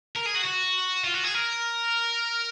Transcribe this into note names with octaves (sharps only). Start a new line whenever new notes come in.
A#4
G#4
F#4
F#4
F4
F#4
G#4
A#4